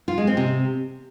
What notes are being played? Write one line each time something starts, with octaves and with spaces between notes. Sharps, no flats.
F4
G#3
C4
C3